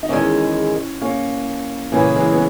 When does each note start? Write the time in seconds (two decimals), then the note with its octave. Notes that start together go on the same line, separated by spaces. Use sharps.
0.03 D#4
0.09 E2 D#3 G#3 C#4 E4
1.02 A#3 C#4
1.92 A#2 C#3 E3 A#3 C#4 G#4 B4
2.16 E3 G#3
2.33 B3